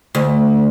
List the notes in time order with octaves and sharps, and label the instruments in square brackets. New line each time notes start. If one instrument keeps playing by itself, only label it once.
[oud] D2